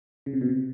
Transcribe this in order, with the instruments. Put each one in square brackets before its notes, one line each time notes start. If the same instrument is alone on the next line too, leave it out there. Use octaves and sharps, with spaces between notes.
[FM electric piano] C#3
C3
B2
C3